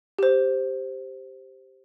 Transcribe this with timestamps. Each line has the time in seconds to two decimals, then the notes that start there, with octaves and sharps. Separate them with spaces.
0.18 G4 C5